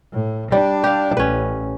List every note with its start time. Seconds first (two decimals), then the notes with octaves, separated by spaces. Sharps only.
0.13 A2
0.52 G3 D4
0.84 G4 F5
1.17 A1 C#4 B4